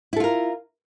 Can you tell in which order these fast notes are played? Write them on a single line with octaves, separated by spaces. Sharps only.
E4 A4 F4 A#4